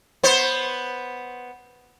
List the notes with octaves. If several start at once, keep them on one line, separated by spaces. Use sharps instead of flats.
B3 C5